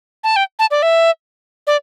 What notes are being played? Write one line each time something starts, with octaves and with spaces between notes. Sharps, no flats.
A5
G5
A5
D5
E5
D5